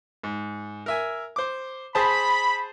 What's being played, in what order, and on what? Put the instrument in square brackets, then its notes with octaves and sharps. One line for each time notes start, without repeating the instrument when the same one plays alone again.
[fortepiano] G#2
A#4 E5 G#5
C5 D6
[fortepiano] G#4 C5 A5 [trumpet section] B5